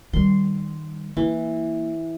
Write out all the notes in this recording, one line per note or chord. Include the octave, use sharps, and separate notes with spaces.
D#3 G3 C6
E3 A#3